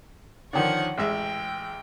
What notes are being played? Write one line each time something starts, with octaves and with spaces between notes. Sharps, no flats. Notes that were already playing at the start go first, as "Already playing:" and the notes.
D3 D#3 F3 C#5 F#5
A1 G#3 E5 G5